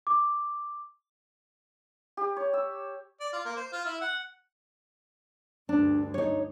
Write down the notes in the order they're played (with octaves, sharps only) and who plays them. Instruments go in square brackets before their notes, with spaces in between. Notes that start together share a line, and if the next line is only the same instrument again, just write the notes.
[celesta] D6
[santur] G4
C#5
E6
[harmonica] D5
F4
A#3
C5
F4
E4
F#5
[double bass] D2 G2 [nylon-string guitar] D4
[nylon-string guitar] D#4 C#5